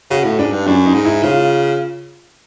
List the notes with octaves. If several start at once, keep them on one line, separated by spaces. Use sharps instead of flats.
C#3 F#4
A2
G#2 D4
G2
F#2 D4
D#4
G#2
E4
C#3 F4